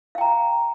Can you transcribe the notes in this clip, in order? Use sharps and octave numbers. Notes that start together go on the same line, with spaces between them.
F5 G5 A#5